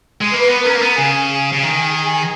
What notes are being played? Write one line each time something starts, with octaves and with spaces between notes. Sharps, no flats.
G#3
A#3 B4
B3
C#4 A#4
A#3
B3
C#3 G#4
C#3
D#3 G#4